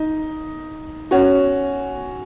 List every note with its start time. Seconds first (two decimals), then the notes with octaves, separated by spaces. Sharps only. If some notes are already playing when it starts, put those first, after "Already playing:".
Already playing: D#4
1.11 C#4 F#4